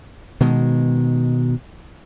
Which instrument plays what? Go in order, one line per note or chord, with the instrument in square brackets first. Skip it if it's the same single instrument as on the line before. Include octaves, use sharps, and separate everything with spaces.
[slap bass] B2 D#3 G#3